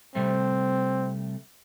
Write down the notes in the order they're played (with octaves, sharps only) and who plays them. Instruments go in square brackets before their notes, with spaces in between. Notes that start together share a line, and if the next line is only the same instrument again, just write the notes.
[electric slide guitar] C3 G3 A3 [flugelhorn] C4